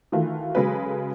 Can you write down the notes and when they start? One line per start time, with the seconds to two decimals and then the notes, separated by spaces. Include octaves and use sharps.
0.12 D#3 E3 A3 F4 F#4
0.55 C#3 F#3 G#3 A4 B4